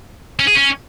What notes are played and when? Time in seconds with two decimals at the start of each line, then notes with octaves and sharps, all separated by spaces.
0.40 C#4
0.47 G#4
0.55 C#4